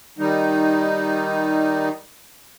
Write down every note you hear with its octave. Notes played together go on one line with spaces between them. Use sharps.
D#3 G3 D#4